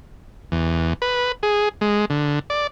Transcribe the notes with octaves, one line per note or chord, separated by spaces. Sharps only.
E2
B4
G#4
G#3
D3
D5